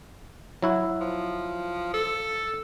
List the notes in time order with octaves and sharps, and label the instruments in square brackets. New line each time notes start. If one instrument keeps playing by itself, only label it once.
[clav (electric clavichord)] F#3 E4 F#4
[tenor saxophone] F3
A4